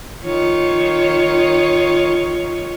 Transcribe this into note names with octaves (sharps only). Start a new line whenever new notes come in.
D#3 F4 C#5